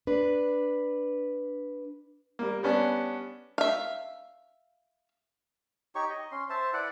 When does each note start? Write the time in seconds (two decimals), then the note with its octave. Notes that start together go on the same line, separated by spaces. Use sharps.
0.07 D4 B4
2.39 G3 A#3
2.63 G3 B3 C#4 D4
3.58 E5 F5
5.95 D#4 G4 C#5 C#6
6.10 D#5
6.32 C#4 C6
6.50 C5 E5 A5
6.73 E4 B4 D5 F#5